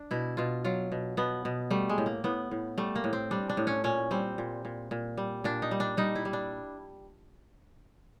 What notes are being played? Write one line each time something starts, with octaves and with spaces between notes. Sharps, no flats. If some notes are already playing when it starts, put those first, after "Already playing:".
Already playing: D4
B2 E4
B2 F4
F#3 F4
B2
B2 B3
B2
G3 A3
G#3
A2
A#3
A2 B3
A2
G3 A3
A#3
A2
C4
G3 D4
D4
A2
C#4
A#2 C#4
G3 C4
A#2
A#2
A#2
G3
A#2 D4
D#4
G3
D4
G3 D#4
E4
G3
D4